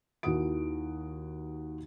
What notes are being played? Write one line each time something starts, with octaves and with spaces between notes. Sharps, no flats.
D#2 D#3 E4 F#4 D#6 D7